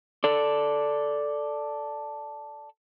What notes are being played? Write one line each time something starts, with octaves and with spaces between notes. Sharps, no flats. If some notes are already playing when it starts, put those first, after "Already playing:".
A4 D5